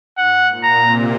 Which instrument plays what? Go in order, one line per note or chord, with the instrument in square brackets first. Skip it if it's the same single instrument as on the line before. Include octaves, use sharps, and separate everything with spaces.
[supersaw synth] G#2 [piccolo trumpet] F#5
[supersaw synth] A#2
[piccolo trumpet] A#5
[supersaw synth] C3